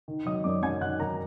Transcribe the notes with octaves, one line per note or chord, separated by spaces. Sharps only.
D#3
F#3 D#5 D#6
F#2 D5 D6
F#2 G#5 G#6
D#3 F#5 F#6
F#3 A#4 A#5